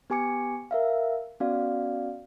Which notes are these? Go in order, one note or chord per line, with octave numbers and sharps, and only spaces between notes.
B3 G4 G#5 D6 C#7
A#4 E5 F5
B3 C#4 F#4 D5 F5